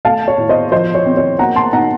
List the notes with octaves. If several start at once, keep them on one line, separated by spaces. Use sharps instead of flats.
A3 F5 A5
C#5
A2
C5 D#5
F3 C5 D#5
C#5
C4
C#5
A#3 F#5 A#5
A5 C6
D#4 F#5 A#5